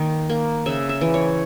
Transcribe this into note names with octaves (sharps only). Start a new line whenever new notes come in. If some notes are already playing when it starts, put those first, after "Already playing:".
Already playing: D#3 A#3
A#3
C#3 E5
E5
E3
C#5